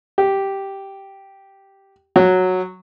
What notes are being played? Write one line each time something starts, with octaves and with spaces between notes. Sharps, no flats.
G4
F#3